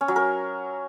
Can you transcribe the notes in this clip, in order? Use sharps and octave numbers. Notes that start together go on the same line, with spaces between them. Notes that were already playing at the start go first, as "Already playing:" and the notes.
C#4
F#3
A#4